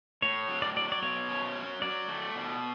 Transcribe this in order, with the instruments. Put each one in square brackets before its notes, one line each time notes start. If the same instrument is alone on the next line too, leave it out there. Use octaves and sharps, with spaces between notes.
[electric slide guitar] A2 [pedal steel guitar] C#5
[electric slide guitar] F#3
[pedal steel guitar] D5
[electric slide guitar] F#3 [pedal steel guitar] D5
[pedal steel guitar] D5
[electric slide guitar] B2 [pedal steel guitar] C#5
[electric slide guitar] C#4
F#3
[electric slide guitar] F#3 [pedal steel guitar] D5
[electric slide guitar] A3
B2